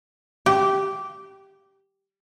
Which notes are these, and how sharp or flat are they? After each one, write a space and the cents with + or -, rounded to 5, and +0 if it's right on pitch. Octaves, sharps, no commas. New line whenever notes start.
G4 -10